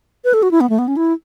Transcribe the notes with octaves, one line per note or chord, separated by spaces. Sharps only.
B4
A4
F#4
E4
B3
A3
B3
C#4
E4